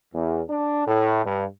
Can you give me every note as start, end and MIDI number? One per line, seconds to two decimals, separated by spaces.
0.15 0.43 40
0.50 0.87 62
0.88 1.23 45
1.26 1.45 43